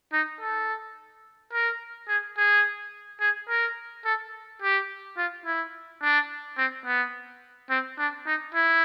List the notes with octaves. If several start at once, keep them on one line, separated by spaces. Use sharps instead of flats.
D#4
A4
A#4
G#4
G#4
G#4
A#4
A4
G4
F4
E4
D4
C4
B3
C4
D4
D#4
E4